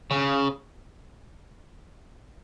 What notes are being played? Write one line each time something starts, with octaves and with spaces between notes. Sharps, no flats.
C#3